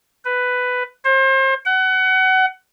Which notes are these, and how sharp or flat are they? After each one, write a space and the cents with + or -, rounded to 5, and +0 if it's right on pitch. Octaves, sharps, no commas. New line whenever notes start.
B4 +10
C5 +35
F#5 +25